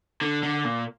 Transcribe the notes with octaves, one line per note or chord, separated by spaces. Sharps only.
D3
D3
A#2